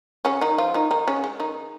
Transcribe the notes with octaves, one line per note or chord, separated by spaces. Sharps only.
C#3 C#4
D#3 D#4
F3 F4
D#3 D#4
D#3 D#4
C#3 C#4
G#3
D#3 D#4